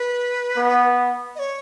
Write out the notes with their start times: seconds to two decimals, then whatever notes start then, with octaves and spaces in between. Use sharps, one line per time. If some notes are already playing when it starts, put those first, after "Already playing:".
Already playing: B4
0.57 B3
1.36 D#5
1.39 C#5